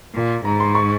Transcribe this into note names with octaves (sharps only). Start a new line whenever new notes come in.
A#2
G#2 A#5
C6
C#6